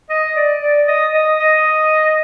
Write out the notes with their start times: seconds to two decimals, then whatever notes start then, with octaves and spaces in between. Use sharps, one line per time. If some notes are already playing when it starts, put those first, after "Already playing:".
0.10 D#5
0.36 D5
0.62 D5
0.88 D#5
1.14 D#5
1.39 D#5